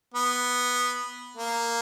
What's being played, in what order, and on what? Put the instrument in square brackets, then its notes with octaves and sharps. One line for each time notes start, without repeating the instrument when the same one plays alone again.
[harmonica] B3
A#3